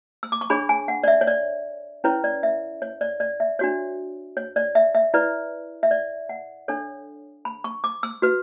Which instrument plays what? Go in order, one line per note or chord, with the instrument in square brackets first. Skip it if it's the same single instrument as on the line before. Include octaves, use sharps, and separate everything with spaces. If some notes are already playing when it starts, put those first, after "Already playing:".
[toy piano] E6
D6
C#6
D4 G#4 C#5 B5
G#5
F#5
D5
E5
C#5
D5
C#4 E4 B4 C#5
D5
E5
C#5
D5
D5
E5
D4 F#4 C#5
C#5
D5
E5
E5
E4 B4 D5
E5
D5
F#5
D4 A4 C#5
B5
C#6
D6
E6
F#4 B4